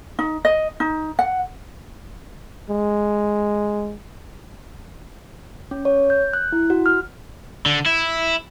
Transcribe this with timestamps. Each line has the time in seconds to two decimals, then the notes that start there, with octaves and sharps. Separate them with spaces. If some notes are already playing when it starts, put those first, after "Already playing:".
0.19 D#4
0.45 D#5
0.80 D#4
1.19 F#5
2.70 G#3
5.71 C#4
5.85 C#5
6.10 G6
6.33 F#6
6.52 E4
6.70 F#4
6.86 F6
7.66 D3
7.86 E4